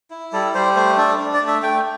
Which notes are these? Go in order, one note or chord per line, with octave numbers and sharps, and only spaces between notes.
E4
G3 A4
G3 C5
A3 C5
D4 A4
D4
D5
A3
E5
A3 G5